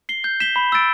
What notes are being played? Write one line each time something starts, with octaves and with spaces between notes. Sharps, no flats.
C7 G7
G6
B6 E7 G7
B5
E6 A6 D7